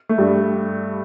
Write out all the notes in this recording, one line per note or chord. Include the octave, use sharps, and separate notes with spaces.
A3
G2 G3